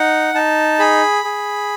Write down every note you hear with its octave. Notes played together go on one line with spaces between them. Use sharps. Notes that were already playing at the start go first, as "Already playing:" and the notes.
Already playing: D#4 F#5
D#4 A5
G#4 B5
G#4